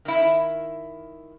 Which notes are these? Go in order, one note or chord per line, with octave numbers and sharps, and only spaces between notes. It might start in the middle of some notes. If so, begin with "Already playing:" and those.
D#3 E4